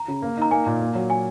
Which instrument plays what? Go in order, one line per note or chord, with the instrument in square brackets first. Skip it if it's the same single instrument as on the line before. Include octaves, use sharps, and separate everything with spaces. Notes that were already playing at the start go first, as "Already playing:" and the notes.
Already playing: [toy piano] A#5
[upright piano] C#3
A#3
[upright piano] D#4 [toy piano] A#5
[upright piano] A#3 [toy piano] G#5
[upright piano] A#2
A#3
F#3
[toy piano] G#5